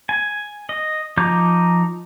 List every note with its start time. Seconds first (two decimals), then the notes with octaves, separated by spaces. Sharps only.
0.09 G#5
0.69 D#5
1.17 F3 D#4 A#5 D6 G6